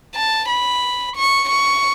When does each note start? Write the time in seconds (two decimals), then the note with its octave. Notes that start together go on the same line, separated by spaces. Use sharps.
0.15 A5
0.49 B5
1.16 C#6
1.50 C#6